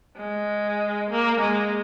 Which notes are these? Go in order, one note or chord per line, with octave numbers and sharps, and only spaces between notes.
G#3
A#3
G#3